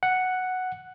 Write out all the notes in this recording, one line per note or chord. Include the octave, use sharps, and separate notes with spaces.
F#5